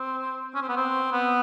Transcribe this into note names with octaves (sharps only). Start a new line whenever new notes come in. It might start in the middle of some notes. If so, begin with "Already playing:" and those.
Already playing: C4
C#4
C4
B3
C4
B3